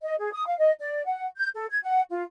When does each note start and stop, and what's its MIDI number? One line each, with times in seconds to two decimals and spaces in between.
0.02 0.16 75
0.18 0.31 68
0.32 0.45 87
0.45 0.57 77
0.58 0.71 75
0.80 1.05 74
1.05 1.26 78
1.37 1.48 91
1.54 1.67 69
1.70 1.78 92
1.83 2.01 78
2.11 2.24 65